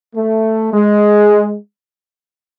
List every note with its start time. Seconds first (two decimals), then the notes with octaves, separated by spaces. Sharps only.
0.16 A3
0.74 G#3